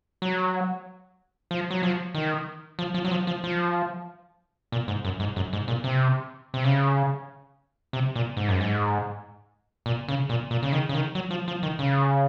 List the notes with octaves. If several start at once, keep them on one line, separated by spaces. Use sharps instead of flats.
F#3
F3
F#3
F3
D#3
F3
F3
F#3
F3
F3
F3
A#2
G#2
F#2
G#2
F#2
G#2
A#2
C3
C3
C#3
C3
A#2
G#2
F#2
G#2
A#2
C#3
A#2
A#2
C#3
D#3
C#3
D#3
F#3
F3
F3
D#3
C#3